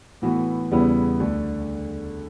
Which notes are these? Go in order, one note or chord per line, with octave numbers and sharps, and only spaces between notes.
A2 E3 B3 F#4
E2 C#3 G3 B3 E4
D2 D3 A3